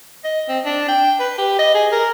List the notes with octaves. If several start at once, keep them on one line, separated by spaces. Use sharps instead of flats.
D#5
C4
D4
G5
B4
G4
D#5
G#4
A#4